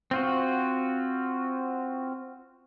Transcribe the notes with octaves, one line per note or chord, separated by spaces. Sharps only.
C4 F4 F#4